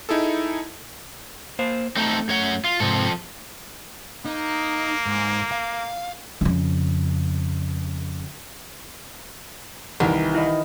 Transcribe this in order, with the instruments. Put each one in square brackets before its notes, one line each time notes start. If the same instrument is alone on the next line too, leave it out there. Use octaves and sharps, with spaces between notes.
[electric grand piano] D#4 E4 G#4 A4
[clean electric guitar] A#3 C5 F5
[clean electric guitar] A3 [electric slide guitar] C4 D#4 A4
[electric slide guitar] F#2 C#5 F#5
F4
[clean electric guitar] G#2 C3 [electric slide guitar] F3 C4 A4
[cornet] A#3 [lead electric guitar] D#4
[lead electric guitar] G#2
F5
[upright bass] F2 C#3
[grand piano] C2 [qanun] D#3 E3 A#4
[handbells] E4 D#5